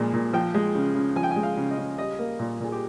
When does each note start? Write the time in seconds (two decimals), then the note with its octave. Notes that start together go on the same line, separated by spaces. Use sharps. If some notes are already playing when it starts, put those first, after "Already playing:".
Already playing: A#2 F3 G#3
0.14 A#2
0.33 F3 G5
0.54 G#3
0.75 C#3
0.95 C#3
1.16 F3 G#5
1.23 G5
1.31 G#5
1.36 G#3
1.43 F5
1.57 C#3
1.71 D#5
1.78 C#3
1.98 G3 D#5
2.19 A#3
2.39 A#2
2.60 A#2 G#4
2.72 G4